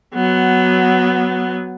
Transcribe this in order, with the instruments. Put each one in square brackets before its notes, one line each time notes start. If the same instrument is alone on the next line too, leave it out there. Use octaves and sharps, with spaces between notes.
[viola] F#3 B3